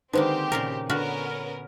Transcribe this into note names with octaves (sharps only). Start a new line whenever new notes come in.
D3 D#3 G#3 A#3 C4 G4 B4 C5
A#2 C#3 A#4
D3 B3 C#4 F#4 A#4 F6